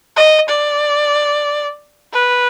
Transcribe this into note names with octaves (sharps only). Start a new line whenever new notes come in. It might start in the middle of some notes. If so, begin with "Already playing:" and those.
D#5
D5
B4